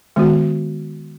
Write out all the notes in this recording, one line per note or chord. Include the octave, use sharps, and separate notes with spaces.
D#3 G#3 B3 F#4